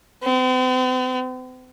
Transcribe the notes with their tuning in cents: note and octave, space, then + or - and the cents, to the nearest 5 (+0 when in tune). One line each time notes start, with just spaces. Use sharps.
C4 -45